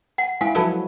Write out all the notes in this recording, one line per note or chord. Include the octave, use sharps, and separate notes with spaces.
F#5
G#3 E4 F5 G#5
F3 F#3 E4 F#4 A4 B4